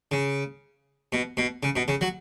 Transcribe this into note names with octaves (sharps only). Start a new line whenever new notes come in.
C#3
B2
B2
C#3
B2
C#3
F#3